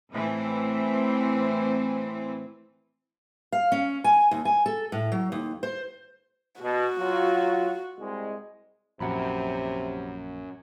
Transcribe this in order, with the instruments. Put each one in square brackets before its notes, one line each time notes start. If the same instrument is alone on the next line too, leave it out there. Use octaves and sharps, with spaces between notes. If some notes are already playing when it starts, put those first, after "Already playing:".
[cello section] A2 E3 C4
[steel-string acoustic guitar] F5
C#4
G#5
D#2
G#5
A4
A2
F#3
D#2
C5
[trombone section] B2 [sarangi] F#4
[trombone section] F#3 F4
C2 G#3
[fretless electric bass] A#1 [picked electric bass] F#2 [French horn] C3 [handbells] F#5 A#5 B5